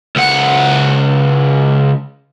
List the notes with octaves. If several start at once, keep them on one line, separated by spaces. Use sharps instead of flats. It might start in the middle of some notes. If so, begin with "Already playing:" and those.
C#2 F#5